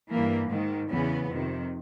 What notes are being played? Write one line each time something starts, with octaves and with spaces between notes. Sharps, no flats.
G2 E3 A#3
G#2 D#3
E2 C#3 E3 B3
F2 C3 D#3